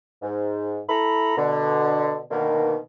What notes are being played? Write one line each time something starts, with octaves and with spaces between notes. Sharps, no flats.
G#2
E4 A4 A#5 B5
B2 D3
B2 D3 D#3 A#3